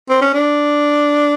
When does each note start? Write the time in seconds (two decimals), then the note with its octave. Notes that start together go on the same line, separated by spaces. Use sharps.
0.09 C4
0.21 C#4
0.34 D4